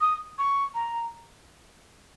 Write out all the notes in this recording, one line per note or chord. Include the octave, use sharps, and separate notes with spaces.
D#6
C#6
A#5